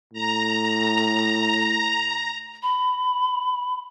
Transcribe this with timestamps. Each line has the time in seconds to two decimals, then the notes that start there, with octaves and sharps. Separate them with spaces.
0.13 A2 A#5
2.63 B5